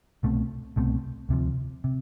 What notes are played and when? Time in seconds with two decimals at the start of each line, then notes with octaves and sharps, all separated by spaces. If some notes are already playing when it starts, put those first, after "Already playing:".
0.23 C2 B2 A3 C4
0.76 C2 B2 A3 C4
1.29 D2 C3 F3
1.84 C3